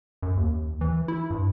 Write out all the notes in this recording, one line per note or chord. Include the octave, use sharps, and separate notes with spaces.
F#2
D#2
E3
E4
G2